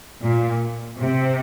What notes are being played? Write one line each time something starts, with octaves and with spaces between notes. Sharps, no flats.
A#2
C3